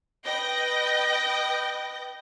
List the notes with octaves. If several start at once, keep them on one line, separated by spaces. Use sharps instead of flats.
B4 D#5 G5 G6 A#6